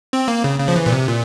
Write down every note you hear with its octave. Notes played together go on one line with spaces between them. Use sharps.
C4
A#3
C#3
C#3
F3
E3
A#2
C3
A#2